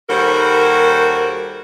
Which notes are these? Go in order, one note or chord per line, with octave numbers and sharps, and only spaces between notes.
D#2 G3 F#4 A4 A#4 C5